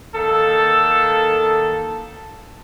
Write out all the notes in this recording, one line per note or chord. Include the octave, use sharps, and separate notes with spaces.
D#3 A#3 A4